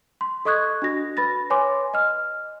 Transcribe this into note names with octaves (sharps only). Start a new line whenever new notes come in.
C6
A4 D#5 C#6 D#6 F#6 G#6
D4 F#4 A#6
B4 B5 A6 A#6
B4 C#5 G#5 C6 D6
D#5 F6